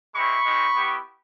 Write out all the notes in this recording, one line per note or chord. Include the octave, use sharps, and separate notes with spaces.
G#3 C4 E4 B5 C#6
G#3 C4 D#4
B3 E4 G4